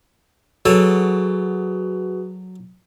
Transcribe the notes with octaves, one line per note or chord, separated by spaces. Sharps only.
F#3 F#4 G#4 A4 B4 C#5